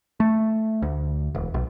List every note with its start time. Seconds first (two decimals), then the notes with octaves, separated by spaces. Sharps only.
0.20 A3
0.82 D2
1.35 E1
1.54 B1